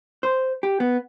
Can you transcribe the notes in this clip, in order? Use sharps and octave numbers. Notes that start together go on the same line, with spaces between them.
C5
G4
B3